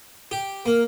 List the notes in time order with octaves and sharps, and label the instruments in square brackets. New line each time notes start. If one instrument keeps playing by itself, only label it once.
[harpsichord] G4
[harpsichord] A#3 [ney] A#4